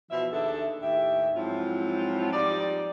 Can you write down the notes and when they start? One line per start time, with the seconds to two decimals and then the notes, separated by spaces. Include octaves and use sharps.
0.11 B2 E3 F3 E5
0.32 D#2 D4 G#4 A4 E5
0.82 D#2 A2 G4 E5
1.35 G#2 F3 F#3 C4 E4 F4
2.33 F3 G3 D#4 D5